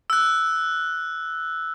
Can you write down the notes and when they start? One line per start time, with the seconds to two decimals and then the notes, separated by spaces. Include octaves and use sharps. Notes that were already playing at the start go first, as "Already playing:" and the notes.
0.10 E6 F#6